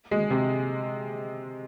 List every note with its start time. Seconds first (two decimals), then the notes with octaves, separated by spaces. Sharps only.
0.11 G#3
0.30 C3